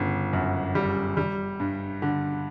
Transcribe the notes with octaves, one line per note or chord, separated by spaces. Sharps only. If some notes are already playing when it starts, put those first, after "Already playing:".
Already playing: G1 C#3
F#2
G3
G3
G2
D3